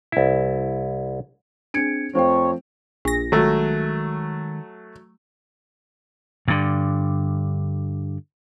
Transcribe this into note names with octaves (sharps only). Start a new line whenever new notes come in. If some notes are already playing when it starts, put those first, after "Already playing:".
C2 E4
C4 D4 G#4 G#6 C#7 D7
F2 F3 A3 C4 C5 C#5 G5
A#1 A#6
D#3 F#3 G#3 A3
G2 D3